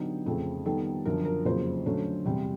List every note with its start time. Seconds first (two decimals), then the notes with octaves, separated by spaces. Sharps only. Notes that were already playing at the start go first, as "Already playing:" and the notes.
Already playing: D3 F#3 B3 D#4 G4
0.26 F2 C#3 F3 A3 C4 G#4
0.65 D#3 G3 B3 A4
1.05 F#2 D3 F3 A#4
1.25 A#4
1.45 F2 C#3 F#3 A#3 C5
1.86 D3 F#3 A3 C#4
2.25 E2 C3 E3 G3